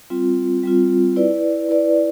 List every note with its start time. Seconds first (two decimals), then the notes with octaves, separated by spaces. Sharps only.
0.10 G3 C4 F4
0.63 G3 C4 F4
1.16 E4 B4 D5
1.69 E4 B4 D5